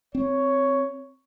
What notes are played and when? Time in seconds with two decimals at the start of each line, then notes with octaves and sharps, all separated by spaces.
0.15 C4 C#5